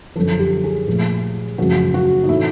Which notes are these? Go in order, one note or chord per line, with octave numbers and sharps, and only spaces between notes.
F#2 D3 F3 A4
G4
G#4
A#2 F3 A3
F#2 C#3 F3 A3 F#4
F#4
D#4
A2 E3 A3 E4